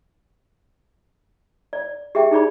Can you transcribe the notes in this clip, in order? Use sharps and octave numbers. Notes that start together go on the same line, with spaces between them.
D5
G4 G#4 E5 G5
D#4 G#4 D5 B5